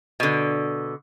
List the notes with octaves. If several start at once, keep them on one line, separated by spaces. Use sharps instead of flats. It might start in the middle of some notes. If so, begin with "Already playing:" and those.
B2 D3